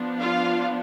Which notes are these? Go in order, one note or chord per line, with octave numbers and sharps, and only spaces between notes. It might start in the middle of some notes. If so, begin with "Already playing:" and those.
Already playing: F3 B3 D4
F4 F5